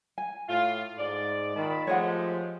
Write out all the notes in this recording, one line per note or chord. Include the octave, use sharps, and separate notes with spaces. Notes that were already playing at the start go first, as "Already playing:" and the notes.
G#5
A2 F4
G#2 D5
A#2 D#3 A5 B5
F3 G#3 A3 G4 C#5 D#5 F#5